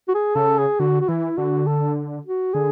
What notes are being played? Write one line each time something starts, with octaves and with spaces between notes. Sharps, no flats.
F#4
G#4
C#3 A4
G#4
D3 F#4
F#4
E3 E4
D3 F#4
A4
F#4
D3 G#4